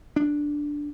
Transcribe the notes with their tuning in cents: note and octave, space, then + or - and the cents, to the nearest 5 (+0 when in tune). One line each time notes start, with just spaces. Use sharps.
D4 +0